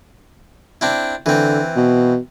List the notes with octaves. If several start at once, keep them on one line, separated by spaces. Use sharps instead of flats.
C4 D4 E4
D3 E3 C4
B2